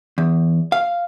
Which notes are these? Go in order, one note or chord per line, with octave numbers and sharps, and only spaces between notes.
E2
F5